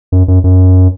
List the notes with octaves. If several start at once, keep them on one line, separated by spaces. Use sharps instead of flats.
F#2
F#2
F#2